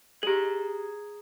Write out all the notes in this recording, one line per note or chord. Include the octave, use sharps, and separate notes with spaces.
G4 G#4 A#5 F#7